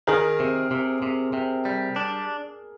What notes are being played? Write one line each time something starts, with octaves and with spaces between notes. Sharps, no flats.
D#3 G#4 A#4
C3
C3
C3
C3
G3
D4